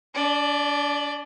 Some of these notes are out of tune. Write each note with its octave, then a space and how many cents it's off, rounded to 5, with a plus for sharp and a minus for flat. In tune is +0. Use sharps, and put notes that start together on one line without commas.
D4 -35 D5 +15